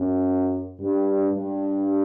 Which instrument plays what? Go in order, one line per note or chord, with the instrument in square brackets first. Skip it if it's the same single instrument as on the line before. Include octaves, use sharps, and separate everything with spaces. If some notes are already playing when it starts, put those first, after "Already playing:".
Already playing: [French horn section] F#2
G2
G2